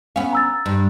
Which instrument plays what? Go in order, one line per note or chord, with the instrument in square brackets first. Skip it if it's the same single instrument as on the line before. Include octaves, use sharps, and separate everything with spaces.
[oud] B3 C#4 [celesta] F5
[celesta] A#5 E6 A6
[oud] G2